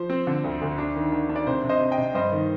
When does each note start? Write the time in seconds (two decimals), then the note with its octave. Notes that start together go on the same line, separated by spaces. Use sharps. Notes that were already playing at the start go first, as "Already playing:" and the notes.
Already playing: F3 C5
0.10 C4
0.27 D3
0.44 D2
0.61 D2
0.78 D4
0.96 D#3
1.12 D4
1.29 D4
1.36 D5
1.47 C3 C5
1.64 C3
1.69 C5 D#5
1.80 C3
1.92 D#5 G5
1.98 C3
2.14 G2 C5 D#5
2.32 D#3